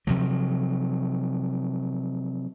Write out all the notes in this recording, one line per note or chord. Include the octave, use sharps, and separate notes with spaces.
C3 F3 F#3